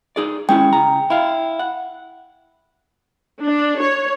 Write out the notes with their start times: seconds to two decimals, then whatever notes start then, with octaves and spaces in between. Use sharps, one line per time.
0.16 D#4 G#4 D5
0.49 G#3 C#4 E4 G5
0.73 C#3 A#5
1.10 E4 F5
1.59 F#5
3.41 D4
3.77 C#5